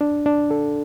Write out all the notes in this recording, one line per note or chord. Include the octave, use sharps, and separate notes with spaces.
D4
D4
A4